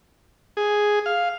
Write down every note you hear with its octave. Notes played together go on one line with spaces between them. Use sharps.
G#4
F5